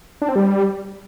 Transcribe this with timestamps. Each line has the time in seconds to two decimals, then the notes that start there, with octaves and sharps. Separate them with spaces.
0.22 D4
0.29 C4
0.36 G3